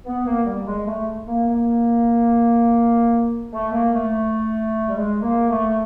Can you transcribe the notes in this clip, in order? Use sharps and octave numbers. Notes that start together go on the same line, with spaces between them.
B3
A#3
G3
G#3
A3
A#3
A#3
A3
A#3
A3
G3
G#3
A#3
A3